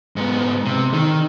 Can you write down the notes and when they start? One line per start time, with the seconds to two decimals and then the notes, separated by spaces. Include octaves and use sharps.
0.16 G#2 B3
0.65 C3
0.93 D#3